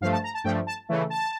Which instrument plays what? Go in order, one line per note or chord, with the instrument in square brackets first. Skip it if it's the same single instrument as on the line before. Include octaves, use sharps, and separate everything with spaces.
[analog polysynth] G2 F3 A3 F5
A5
A#5
A5
G2 F3 A3 G5
A5
C#3 E3 A3
A5